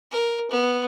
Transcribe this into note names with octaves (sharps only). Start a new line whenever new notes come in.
A#4
B3